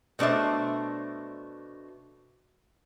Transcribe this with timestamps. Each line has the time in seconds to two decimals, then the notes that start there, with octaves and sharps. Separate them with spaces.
0.19 B2 A3 D4 C5 E5